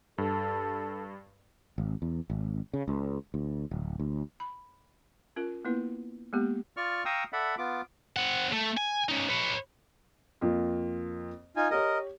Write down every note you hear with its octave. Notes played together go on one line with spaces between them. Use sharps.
G2 A4
G#1
E2
G#1
C#3
C#2
D2
D1
D2
B5
C#4 F4 A#4
A#3 B3 E4 B4
G#3 A#3 B3 G4
F4 D5 C#6 F6
F5 G5 A#5 C#6 D#6 E6
A4 D5 E5 F#5 B5
B3 F4 D6
C4 F#5
A3
G#5
C#4 D#4
B4 C#5
F2 A#3 F4
D#4 F4 G#5
G4 A#4 C#5 D#5